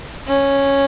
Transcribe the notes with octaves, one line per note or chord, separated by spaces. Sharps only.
C#4